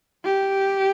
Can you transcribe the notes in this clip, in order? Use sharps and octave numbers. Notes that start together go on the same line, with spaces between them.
G4